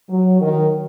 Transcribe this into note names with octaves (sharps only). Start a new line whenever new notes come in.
F#3
D#3